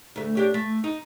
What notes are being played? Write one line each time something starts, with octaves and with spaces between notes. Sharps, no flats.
D2 A3
D4 G4 C#5
A3
D#4